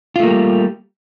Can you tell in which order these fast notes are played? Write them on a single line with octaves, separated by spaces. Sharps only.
F4 A3 A#3 G3